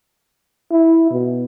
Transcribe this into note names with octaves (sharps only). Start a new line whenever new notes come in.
E4
B2